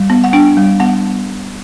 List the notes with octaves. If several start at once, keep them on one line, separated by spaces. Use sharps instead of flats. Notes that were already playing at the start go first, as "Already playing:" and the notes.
Already playing: G3
B3
F#5
D4 G5
G3
B3 F#5